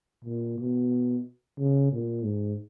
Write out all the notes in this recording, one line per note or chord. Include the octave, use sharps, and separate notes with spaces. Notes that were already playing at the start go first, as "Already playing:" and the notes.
A#2
B2
C#3
A#2
G#2